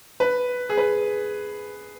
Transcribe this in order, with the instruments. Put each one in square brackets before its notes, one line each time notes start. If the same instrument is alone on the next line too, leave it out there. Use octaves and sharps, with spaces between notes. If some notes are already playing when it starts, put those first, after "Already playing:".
[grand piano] B4
G#4
B4